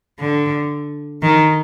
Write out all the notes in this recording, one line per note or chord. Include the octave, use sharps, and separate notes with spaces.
D3
D#3